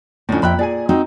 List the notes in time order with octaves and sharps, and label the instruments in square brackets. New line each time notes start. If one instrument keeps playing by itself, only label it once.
[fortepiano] F2 A2 [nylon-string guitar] D3 C#4
[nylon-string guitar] F2 E5 G5 [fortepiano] A#2 B5 F#6
[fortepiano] A#2 G#4 G#5 [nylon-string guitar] D5
[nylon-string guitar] C4 D#4 F#4